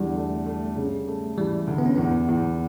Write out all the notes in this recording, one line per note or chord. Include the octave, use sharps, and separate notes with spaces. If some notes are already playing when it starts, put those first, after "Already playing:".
Already playing: E2 D3 G3
A3
A3
C#3
A3
E3 G3
D2
B3
C#4
E2 B3
E2